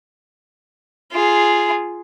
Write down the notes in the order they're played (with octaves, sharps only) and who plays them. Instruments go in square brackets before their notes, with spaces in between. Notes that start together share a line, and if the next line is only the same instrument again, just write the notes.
[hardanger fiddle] F4 G#4